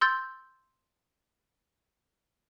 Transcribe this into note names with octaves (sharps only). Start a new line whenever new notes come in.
C6 E6 G6 A6